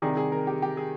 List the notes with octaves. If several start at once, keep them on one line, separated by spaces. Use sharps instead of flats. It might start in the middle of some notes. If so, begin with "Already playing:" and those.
C3 D#3 G3 G#4
G#4
A#4
G4
G4
G#4